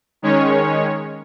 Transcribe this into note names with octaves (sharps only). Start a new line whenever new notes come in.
D#3 G#3 C#4 C#5